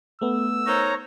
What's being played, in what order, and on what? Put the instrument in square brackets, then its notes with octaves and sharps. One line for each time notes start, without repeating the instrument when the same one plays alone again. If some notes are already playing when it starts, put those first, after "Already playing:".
[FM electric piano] A3 B3 [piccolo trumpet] E6
[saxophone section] D#4 A#4 C5 [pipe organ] C#5 A#5